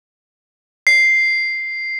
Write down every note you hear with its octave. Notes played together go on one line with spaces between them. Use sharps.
C7